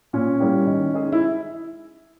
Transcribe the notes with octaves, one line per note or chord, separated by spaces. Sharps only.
A#2 C#4
G3 A#3 E4 G4
D#3
G#3 D#4 G#4
E4